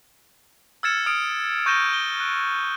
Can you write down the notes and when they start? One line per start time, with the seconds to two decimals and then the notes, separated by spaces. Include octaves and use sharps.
0.83 E6 F6 G#6 A6 C#7 E7
1.06 D#6 F6 D7
1.66 C#6 G6 A#6 D#7 E7 G7
1.93 G7
2.20 F#6 D7